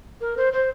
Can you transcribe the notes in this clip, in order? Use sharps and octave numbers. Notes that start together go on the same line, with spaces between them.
A#4
C5
C5